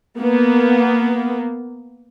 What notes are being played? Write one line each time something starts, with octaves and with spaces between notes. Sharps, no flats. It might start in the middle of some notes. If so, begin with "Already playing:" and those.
A#3 B3